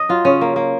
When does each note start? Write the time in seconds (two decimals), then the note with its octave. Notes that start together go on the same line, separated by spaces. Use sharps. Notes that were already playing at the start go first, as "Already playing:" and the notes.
Already playing: D#5
0.09 F#3 F4
0.25 C#3 C#4
0.41 A#3
0.56 A#3